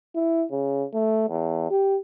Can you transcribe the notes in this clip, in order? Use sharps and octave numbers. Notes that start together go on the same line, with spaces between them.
E4
C#3
A3
E2
G4